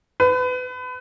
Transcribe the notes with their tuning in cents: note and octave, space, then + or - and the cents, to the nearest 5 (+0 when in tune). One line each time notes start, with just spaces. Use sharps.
B4 +30